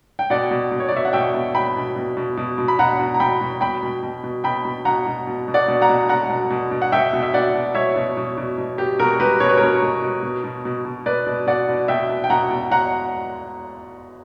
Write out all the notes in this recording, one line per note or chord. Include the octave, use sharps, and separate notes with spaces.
G5
B2 D5 F#5
B2
B2
C#5
D5
B2 E5
F#5
B2 E5 G5
B2
B2 G5 B5
B2
B2
B2
B2
B2
B5
B2 F#5 A#5
B2
A#5
B2 G5 B5
B2
B2 G5 B5
B2
B2
B2
B2 G5 B5
B2
B2 F#5 A#5
B2
B2
B2
D5 F#5
B2
F#5 A#5
B2
B2 F#5 A#5
B2
B2
B2
F#5
B2 E5 G5
B2
E5
B2 D5 F#5
B2
B2 C#5 E5
B2
B2
B2
B2
B2 G4
B2 F#4 A#4
B2 G4 B4
B2 C#5
B4
B2 A#4 C#5
B2
B2
B2
B2
B2
B2
B2 B4 D5
B2
B2 D5 F#5
B2
B2 E5 G5
B2
G5
B2 F#5 A#5
B2
B2 F#5 A#5